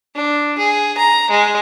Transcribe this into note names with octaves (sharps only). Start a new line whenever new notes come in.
D4
G#4
A#5
G#3